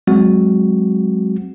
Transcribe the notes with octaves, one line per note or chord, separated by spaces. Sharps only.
F#3 G#3 C4 F#4